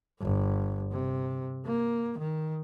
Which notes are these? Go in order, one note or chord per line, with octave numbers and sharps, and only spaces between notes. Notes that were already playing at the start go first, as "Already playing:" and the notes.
G1
C3
A#3
D#3